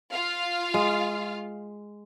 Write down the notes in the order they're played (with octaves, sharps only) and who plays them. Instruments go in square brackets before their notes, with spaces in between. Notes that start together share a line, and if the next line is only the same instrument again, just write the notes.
[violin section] F4 F5
[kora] G#3